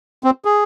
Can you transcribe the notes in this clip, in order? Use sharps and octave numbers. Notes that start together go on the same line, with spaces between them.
C4
G#4